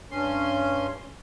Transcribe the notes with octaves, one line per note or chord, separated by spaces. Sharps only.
G2 C#4 C6